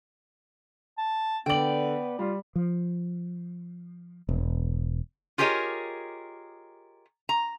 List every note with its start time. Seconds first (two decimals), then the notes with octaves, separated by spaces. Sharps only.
0.98 A5
1.46 D3 B3 D5 G5 F#7
2.19 G3 F4
2.56 F3
4.29 E1
5.38 F4 G4 G#4 A#4 C#5 D#5
7.29 A#5